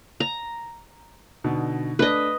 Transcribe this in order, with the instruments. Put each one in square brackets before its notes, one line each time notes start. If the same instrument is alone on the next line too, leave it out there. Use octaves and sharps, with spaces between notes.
[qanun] A#5
[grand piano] B2 D3 D#4
[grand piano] A3 D4 [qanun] B4 D#5